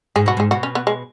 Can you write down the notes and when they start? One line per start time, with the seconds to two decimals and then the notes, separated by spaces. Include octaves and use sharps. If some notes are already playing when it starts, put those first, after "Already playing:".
0.16 G#2 G#4
0.26 B2 F#4
0.37 G#2 G#4
0.51 B2 F#4
0.63 C#4
0.75 B3
0.87 G#3